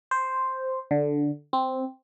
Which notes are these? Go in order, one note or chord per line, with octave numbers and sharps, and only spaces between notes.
C5
D3
C4